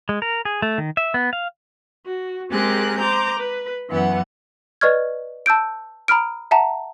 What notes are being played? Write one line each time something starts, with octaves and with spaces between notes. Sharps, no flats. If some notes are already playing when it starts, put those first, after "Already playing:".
G#3
A#4
G#4
A3
D#3
E5
B3
F5
F#4
G#3 C4 G4 G#4 A#4 F#6
C5 A#5 D6 G6
B4
F#2 E3 B3 F#5
B4 D5 D#5 C#6 F6 G#6
A5 E6 G6 D7
A#5 B5 D#6 F6 D7
E5 F#5 A5 A#5